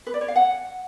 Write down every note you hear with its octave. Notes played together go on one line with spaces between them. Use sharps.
B4
D5
C#5
F5
F#5